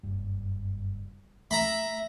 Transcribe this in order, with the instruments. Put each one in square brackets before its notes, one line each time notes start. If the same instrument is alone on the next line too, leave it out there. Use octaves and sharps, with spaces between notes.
[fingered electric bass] F#1 G2
[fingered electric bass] A3 [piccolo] E5 [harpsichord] A#5 B5